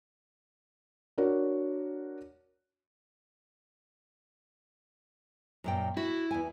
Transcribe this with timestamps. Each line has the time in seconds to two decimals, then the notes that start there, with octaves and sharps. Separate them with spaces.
1.18 D4 F#4 A#4 C#5
5.64 F#2 A#2 G5
5.97 E4 F#4
6.31 E2 G#5